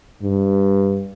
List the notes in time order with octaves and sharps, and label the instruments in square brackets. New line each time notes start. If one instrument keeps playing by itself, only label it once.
[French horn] G2